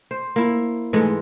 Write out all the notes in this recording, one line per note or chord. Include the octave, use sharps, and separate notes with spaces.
C5
A#3 E4
G#2 E3 G#3 A3